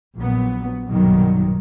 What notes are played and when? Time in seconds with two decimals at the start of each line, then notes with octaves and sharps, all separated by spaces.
0.16 A#1 A#2 F#3 B3
0.89 B1 G2 A#2 D#3 F#3